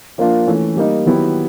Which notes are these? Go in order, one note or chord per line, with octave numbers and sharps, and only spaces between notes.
F3 A#3 D4 F4
E3 A3 C#4
G3 A#3 D#4
D#3 F#3 B3 E4 G4